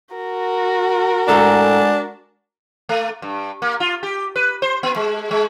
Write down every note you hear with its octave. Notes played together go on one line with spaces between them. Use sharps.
F#4 A#4
A2 G#3 D4 A4 F#5 G#5 A#5
A3
G2
A#3
F4
G4
B4
C5
B3
G#3
G#3